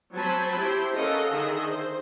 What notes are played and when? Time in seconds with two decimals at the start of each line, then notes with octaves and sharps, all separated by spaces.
0.13 F#3 C4 C5 G#5 A5 B5
0.59 E4 G4 C5
0.93 C#4 A4 A#4 D#5 F5 F#5
1.32 D3 D#3 G#4 D#5 E5
1.68 C5